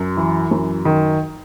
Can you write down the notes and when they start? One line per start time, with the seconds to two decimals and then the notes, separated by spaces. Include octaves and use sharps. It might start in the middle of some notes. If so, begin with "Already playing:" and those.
Already playing: F#2
0.17 E3
0.51 F#2
0.85 D#3